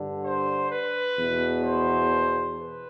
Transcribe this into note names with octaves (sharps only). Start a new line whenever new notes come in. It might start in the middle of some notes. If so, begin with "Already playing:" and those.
Already playing: G2 D3
C5
B4
E2 B2
C5
B4